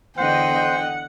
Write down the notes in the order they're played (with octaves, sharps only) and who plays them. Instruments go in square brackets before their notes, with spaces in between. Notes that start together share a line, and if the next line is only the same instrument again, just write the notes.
[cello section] E2 D3 D#5 [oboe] C5 [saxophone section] F#5 [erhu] G5